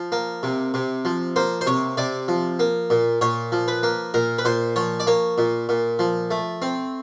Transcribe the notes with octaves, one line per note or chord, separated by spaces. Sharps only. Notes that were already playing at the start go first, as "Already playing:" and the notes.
Already playing: F3
A#3
C3
C3
F3
A#3 C5
C5
C3 C#5
C3 D5
F3
A#3
A#2
A#2 C#5
F3
B4
A#3
A#2 A#4
B4
A#2 C5
F3 C#5
D5
A#3 C#5
A#2
A#2
F3
A3
C4